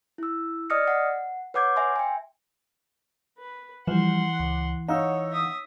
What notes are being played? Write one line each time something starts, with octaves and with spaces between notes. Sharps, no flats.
E4 E6
D5 D#5 D#6 F6 A#6 C#7
F#5
B4 C#5 F#5 D6 G6 G#6
E5 G#5 C6
G5 G#5
B4
E3 F3 G3 F#5 C6
C#2
D#4 C#5 F5 F#5 E6
E5 D#6